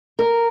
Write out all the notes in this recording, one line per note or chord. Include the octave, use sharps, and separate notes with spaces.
A#4